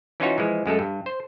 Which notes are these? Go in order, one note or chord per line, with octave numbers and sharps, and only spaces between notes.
E3 C#4 D#4 F4 F#4 C#5
E3 F3 G#3
F#2 G#3 A3 A4
G2
C5